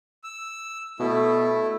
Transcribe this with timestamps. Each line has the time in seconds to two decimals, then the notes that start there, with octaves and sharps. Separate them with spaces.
0.24 E6
1.00 B2 A3 E4